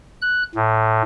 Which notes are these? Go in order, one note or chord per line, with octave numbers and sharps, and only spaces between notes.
F#6
A2